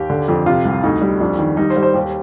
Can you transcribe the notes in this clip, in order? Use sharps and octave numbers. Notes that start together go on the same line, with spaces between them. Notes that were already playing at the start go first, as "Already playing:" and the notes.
Already playing: D#2 G4
D3
F2
C3 F4
C2
D2 D#4
G3
F2 D4
D#3
G3 D#4
C5
G3
C5
D#2 G4